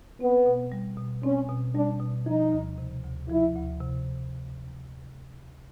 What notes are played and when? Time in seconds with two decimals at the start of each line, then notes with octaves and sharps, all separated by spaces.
0.20 B3 C4
0.46 B2
0.72 G3
0.97 B2
1.23 C4 C#4
1.49 B2
1.75 G3 D4
2.00 B2
2.26 F3 D#4
2.52 D2
2.78 C3
3.04 D2
3.29 F3 E4
3.55 D2
3.81 C3